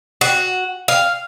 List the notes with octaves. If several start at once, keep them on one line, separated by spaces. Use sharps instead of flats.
F#4
F5